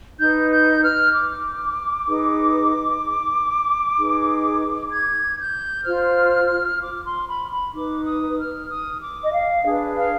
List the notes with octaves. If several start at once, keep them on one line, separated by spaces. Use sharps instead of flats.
D#4 B4 G6
G6
F6
D6
D#4 G#4 B4
D#4 G#4 B4
G#6
G6
F4 C5 F6
D6
C6
B5
B5
D#4 B4 D6
D#6
F6
D#6
D6
D#5
F5
D4 G#4 B4
F5